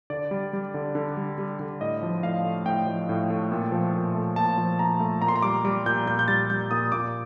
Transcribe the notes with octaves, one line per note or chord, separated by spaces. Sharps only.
D3 D5
G3
G3
D3
D3
G3
G3
D3
A2 D#5
F3
A2 F5
A3
A2 G5
F3
A2
A3
A#2
F3
A#2
A3
A#2 A5
F3
A#2 A#5
A3
A#2 A#5
C6
A#5
G3 D6
G3 D6
A#2 G6
A#2 G6
G6
G3 A6
G3 G6
A#2 D#6
A#2 D6